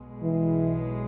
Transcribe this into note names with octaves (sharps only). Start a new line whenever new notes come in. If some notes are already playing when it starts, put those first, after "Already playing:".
Already playing: B1 B2 G#3
E3